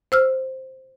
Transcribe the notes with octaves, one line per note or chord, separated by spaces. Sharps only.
C5 E6 F6